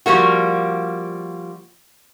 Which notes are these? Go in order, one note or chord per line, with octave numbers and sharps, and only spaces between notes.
F3 G3 A#3 F#4